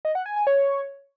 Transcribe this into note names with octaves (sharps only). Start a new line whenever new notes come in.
D#5
F#5
G#5
G#5
C#5